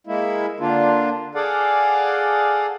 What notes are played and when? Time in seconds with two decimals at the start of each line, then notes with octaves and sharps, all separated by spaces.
0.07 G#3 A#3 E4
0.60 D3 A#3 D4 F4
1.35 G#4 A4 D5 F5 F#5